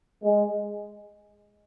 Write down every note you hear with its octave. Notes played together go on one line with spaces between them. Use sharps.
G#3